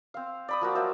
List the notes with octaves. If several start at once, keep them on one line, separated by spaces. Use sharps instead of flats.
C4 F5
D5 B5 D#6
F3 A#3 F#4
F#3 A#3 C5 E5